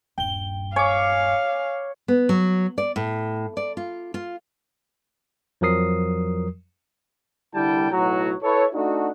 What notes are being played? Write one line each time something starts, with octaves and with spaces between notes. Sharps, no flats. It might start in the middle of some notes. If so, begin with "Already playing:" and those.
D#1 G2 G5 G7
C#5 F5 G#5 D6
B3
F#3
D5
A2
D5
F4
F4
F2 F3 F#3 A#4 D#6 C7
C2 D3 G3 E4 G5 A5
B1 A2 F#3 E4 F#4 A#5
E4 A4 B4 C#5
A3 D4 D#4 F#4